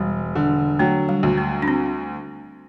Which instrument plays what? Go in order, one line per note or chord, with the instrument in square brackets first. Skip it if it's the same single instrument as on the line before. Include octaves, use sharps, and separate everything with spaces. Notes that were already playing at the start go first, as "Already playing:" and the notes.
Already playing: [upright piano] E1 [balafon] G3
[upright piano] D3
[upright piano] F#3 [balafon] A3
[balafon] G3
[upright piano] D2
[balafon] A3
D4
C4